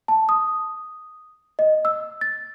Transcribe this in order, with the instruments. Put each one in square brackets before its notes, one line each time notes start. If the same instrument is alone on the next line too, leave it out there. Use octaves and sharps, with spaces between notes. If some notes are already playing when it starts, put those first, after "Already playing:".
[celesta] A5
D#6
D#5
E6
A6